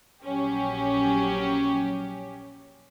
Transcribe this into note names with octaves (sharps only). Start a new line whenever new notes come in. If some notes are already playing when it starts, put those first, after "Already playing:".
A#1 F#3 C#4 G4